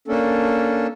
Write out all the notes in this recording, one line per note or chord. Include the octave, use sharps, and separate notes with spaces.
A#3 C#4 D4 A4